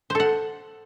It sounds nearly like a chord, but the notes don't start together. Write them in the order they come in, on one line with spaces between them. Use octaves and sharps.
C5 A4 F#5